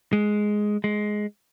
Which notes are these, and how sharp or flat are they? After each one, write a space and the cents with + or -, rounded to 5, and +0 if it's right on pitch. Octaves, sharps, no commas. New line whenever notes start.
G#3 +5
G#3 +10